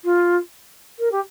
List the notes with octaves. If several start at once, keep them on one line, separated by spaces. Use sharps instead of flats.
F4
A#4
G4